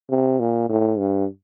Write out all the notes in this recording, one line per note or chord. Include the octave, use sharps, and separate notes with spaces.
C3
A#2
A2
G2